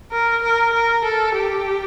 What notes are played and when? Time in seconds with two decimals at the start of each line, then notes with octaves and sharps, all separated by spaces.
0.12 A#4
0.43 A#4
0.73 A#4
1.04 A4
1.35 G4